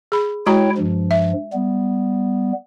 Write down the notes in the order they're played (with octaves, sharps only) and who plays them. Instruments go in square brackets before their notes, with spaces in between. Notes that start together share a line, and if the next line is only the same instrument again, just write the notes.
[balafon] G#4 B5
[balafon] G#3 F#4 A#5 [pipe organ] E4 C#5 G5
[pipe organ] G2 F3
[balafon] E5
[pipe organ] G3 B3